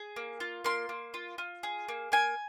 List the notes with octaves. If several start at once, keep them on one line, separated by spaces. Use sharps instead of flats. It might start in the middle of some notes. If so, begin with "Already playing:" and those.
Already playing: G#4
A#3
F4
A#3 C6
A#3
F4
F4
G#4
A#3
A#3 G#5